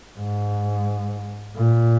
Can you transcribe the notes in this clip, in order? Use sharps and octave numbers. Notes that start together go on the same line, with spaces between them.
G#2
A#2